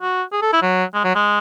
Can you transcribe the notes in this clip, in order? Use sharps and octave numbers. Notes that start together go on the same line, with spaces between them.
F#4
G#4
A4
E4
F#3
G#3
F#3
G#3